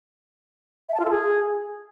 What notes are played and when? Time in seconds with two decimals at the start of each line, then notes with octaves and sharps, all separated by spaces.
0.89 E5
0.94 A5
0.99 F4
1.05 A4
1.10 G#4